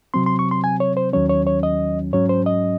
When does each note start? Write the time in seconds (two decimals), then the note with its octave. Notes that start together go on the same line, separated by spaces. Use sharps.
0.14 C3 F#3 C4 C6
0.26 C6
0.39 C#6
0.51 C6
0.64 G#5
0.80 C#5
0.97 C5
1.13 D#2 D#3 F#3 C#4 C#5
1.30 C#5
1.47 C#5
1.63 D#5
2.13 G#2 F#3 C#4 C#5
2.29 C5
2.46 D#5